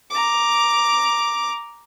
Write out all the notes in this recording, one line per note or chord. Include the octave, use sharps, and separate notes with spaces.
A#5 D6